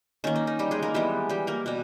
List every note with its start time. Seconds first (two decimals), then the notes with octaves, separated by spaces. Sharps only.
0.24 D#3 A#3 C#4
0.36 D#4
0.47 D#4
0.59 G3 G4
0.71 G#3 G#4
0.83 A#3 A#4
0.94 E3 G3 G#3 B3 G4
1.29 G3 G4
1.47 A#3 A#4
1.66 B2 G3